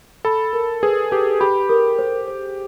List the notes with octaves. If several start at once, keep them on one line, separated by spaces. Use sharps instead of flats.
A4 B5
A#4
G#4 B4
G4 B4
G4 B5
A#4
C5
C5